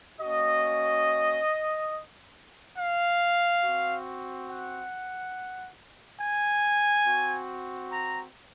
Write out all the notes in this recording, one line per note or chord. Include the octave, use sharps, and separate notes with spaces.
A#3 C#4 F#4 D#5
F5
C4 F#4
F#5
G#5
C4 F#4
A#5